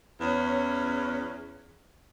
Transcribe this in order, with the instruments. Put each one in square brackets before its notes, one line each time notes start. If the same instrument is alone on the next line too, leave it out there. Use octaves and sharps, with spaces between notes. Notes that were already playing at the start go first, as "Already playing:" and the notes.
[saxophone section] E2 C#4